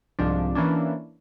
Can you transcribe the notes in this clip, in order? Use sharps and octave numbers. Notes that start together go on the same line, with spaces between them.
C2 G#2 F3 D4
E3 A#3 C#4 D4